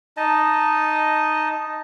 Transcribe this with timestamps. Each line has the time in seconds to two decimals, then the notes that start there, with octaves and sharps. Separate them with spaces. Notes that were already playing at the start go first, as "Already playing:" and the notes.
0.17 D#4 D#5 A5